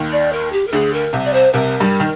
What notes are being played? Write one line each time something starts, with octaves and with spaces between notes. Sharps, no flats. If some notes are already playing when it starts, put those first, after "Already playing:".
Already playing: D#2 D#3
D5
A#4
G4
A#4
D2 D3 G#4
A#4
C2 C3
D5
C5
C2 C3 A#4
G2 G3
D#3